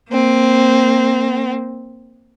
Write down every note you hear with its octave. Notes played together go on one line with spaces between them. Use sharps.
A#3 C4